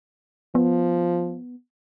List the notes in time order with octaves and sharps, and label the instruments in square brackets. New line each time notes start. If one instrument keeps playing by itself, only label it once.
[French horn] F3 [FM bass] B3